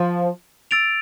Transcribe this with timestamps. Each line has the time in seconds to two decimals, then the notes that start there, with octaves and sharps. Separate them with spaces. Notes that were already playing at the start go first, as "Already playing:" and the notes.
Already playing: F3
0.71 E6 A6 D7 F7